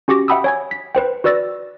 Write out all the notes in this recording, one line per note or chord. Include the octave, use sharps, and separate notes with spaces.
C#4 F#4 G4 D6 A#6
E5 F#5 G5 B5 D#6 E6
C#5 G#5 G#6
B6
B4 C5 G5
F#4 B4 D5 E6 A6 A#6